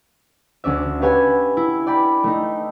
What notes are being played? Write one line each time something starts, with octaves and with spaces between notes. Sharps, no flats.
D2 C#4 D5 E5
G4 B4 C#5 E5 F#5 G#5
E4
D5 G5 B5
A3 D#4